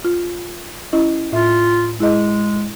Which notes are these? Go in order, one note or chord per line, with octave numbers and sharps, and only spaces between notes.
F4
C#4 E4 D#5
A2 F4 E5
G#3 E4 G#4 D#5